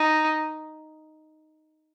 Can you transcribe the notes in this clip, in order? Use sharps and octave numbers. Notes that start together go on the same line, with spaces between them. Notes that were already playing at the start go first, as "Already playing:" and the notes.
Already playing: D#4